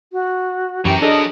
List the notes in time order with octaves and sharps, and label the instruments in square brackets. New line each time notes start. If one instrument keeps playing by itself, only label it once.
[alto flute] F#4
[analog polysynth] F#2 E3 C#7 [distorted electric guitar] F#3 A#4 [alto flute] G4
[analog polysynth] D4 A4 D#5 [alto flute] G#4